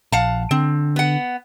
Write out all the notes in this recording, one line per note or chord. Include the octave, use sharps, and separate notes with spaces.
A#1 F5 F#5 A5
D3 C4
B3 F#5